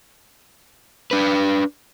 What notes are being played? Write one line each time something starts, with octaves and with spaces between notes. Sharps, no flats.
D4 B4